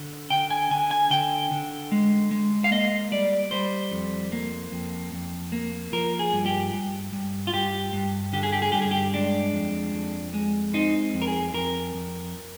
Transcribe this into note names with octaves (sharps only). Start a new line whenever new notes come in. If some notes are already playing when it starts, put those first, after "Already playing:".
Already playing: D3
D3 G5
G#5
D3 G#5
G#5
D3 G5
D3
G#3
G#3
F5
A#3 D#5
G3 D5
G3 C5
F2
A#3
F2
F2
A#3
F3 A#4
G#4
G2
G4
G2
G2
F4
G2 G4
G2
D3 G4
G#4
G4
G#4
G2 G4
G#4
G4
G#3 D4
F2
F2
G#3
C4 D#4
F2
A#4
G#4
F2 A#4
F2